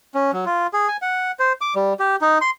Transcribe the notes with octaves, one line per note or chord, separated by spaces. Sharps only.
C#4
F#3
F4
G#4
G#5
F#5
C5
D6
G3
G4
D#4
C6